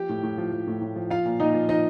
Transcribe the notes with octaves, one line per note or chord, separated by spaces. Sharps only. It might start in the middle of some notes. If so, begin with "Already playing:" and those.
Already playing: F3 G4 G5
A2
A2
F3
F3
A2
A2
F3
F3 F4 F5
A#2
A#2 D#4 D#5
F3
F3 D#4 D#5